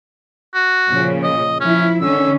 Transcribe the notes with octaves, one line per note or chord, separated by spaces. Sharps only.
F#4
A#2 C#3 F3
D#5
F3 C#4 E4
D3 D#3 C#4 E6